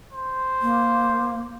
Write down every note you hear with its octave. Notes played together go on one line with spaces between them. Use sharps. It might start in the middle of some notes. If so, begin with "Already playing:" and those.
C5
A#3